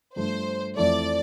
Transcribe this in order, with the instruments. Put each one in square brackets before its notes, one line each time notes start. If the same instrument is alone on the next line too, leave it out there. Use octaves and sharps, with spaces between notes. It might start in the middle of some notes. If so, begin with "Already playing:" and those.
[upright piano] G2 F3 A3 D4 [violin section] C5
[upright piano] F2 E3 A3 [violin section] D5